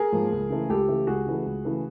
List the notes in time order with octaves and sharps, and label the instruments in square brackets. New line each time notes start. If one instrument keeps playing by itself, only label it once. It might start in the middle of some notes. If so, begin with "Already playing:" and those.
Already playing: [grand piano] G#4 A#4
G#2 F3 A#3
C#2
C#3 E3 A3
C#2 G4 A4
C#3 E3 A3
C#2 F#4 G#4
C#3 E3 A3
C#2
C#3 E3 A3